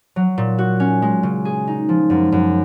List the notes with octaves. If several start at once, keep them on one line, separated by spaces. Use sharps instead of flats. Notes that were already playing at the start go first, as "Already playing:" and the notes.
F#3
A#2
F#4
C#4
G#3
C#3
G#4
D#4
F3
F#2
F#2